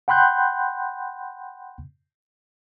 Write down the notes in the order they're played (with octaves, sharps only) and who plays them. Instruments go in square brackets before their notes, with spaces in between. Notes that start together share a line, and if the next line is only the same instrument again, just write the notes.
[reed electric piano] F#5 G5 B5 C6 F#6 G6